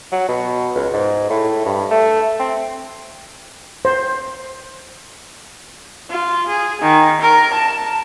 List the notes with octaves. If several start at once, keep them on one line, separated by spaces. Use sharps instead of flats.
F#3
B2
C#2
G#2
A2
G2
A3
C4
C5
F4
G#4
D#3
A#4
A5